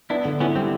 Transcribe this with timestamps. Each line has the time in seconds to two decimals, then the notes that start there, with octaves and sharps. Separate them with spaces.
0.10 B3 D4 E4
0.25 D3
0.40 B3 C#4 E4
0.56 G3 C4